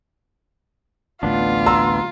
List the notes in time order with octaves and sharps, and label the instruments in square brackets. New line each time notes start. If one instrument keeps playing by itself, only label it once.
[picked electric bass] A1 D2 A2 [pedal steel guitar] B3 D4 [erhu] F4
[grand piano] A#5 C6 E6